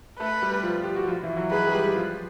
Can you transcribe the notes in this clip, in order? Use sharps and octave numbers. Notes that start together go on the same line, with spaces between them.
A3 A4 B4
G3 G4
F3 F4
G4
F#4
F3 F4
E3 E4
F#3 F#4
G#3 G#4 B4
G#4
G3 G4
F3 F4